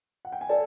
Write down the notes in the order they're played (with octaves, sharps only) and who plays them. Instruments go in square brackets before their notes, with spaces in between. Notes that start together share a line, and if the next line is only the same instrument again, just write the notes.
[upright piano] F#5
G5
G#5
[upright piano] A4 A5 [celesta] D5